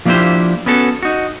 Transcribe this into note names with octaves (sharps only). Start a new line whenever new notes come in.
F3 A#3 D4 E4 G4 C5
B3 C#4 F#4 A4
D#4 F#4